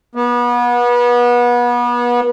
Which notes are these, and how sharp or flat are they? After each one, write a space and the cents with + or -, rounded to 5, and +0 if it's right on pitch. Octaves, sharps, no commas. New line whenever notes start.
B3 -30